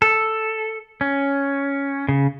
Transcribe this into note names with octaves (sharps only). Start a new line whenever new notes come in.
A4
C#4
C#3